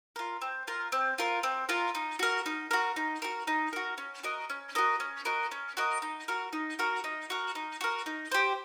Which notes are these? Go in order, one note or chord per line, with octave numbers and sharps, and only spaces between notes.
F4 A#4
C4
F4 A#4
C4
F4 A#4
C4
F4 A#4
D#4
F#4 A#4
D#4
F#4 A#4
D#4
F#4 A#4
D#4
F#4 A#4
C#4
F#4 A#4 D#5
C#4
F#4 A#4 D#5
C#4
F#4 A#4 D#5
C#4
F#4 A#4 D#5
D#4
F#4 A#4
D#4
F#4 A#4
D#4
F#4 A#4
D#4
F#4 A#4
D#4
G4 C5